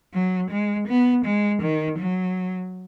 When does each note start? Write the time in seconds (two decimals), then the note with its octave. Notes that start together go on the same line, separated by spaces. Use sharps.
0.14 F#3
0.51 G#3
0.88 B3
1.25 G#3
1.62 D#3
1.99 F#3